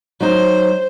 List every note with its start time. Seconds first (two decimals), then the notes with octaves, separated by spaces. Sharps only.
0.20 F#3 D#4 C5